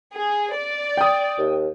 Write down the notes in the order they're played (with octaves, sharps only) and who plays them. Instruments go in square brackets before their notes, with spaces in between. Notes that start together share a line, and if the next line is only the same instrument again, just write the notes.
[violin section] G#4
D5
[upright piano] G5 D#6
[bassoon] D#2